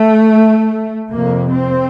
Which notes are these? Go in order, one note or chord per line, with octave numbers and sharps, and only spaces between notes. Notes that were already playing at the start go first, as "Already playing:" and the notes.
Already playing: A3
F2 C3 A#3
C4